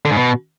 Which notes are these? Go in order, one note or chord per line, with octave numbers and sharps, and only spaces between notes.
D3
G#2
B2